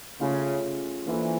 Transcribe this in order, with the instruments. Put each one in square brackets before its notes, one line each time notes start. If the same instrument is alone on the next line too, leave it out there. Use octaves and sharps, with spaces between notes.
[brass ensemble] C#3 [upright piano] A3 C#4 F4 G#4
[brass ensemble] E3 [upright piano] A#3 D4 F4 A4 C5